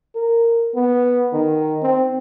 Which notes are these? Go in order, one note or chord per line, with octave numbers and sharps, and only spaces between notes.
A#4
B3
D#3
C4